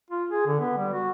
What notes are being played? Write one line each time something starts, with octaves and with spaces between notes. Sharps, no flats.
F4
G#4
D3
B3
G3
F#4